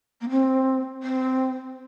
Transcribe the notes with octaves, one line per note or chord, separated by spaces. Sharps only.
A#3
C4
C4